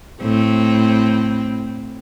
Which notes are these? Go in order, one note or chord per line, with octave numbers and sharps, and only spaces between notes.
A2 C4